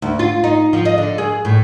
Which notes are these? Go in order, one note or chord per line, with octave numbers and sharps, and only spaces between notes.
D2
F4
D#4
F3
D#5
D3
G#4
A2